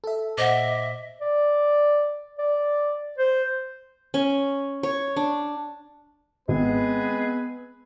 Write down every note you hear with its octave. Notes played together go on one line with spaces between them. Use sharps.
A4 E5
A#2 C5 D#5 E5 F#5 D6
D5
D5
C5
C#4
C#5
D4
G#1 G#3 B3 C4 G#4 B4